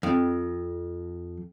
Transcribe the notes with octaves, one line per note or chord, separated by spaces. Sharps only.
F2